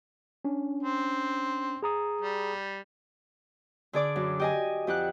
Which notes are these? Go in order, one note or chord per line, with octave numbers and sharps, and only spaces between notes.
C#4 D4
C4
G#4 A#5 D#6
G3
D3 G#4 D5 D6
F#2
G4 D#5 G#5
F2 G4 F#5 F#6